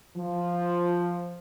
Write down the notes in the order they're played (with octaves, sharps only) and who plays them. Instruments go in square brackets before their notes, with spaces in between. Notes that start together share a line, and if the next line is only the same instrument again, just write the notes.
[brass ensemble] F3